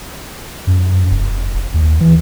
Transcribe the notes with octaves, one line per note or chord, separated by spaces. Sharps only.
F#2
F1
D#2
E3